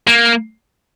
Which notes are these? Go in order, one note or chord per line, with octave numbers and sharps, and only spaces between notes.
A#3